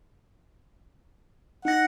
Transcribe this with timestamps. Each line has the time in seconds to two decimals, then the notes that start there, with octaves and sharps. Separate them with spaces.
1.65 D#4 F#5 A#6